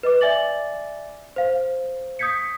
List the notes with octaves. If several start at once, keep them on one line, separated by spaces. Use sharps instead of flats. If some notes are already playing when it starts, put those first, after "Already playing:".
B4 D#5 D6
D5 E5 G#5 D6 A6 F#7
C5 F5
D#6 G6 G#6 B6 C#7